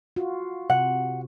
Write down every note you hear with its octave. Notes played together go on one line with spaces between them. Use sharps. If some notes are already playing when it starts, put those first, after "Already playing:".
F4 F#4
C3 F#5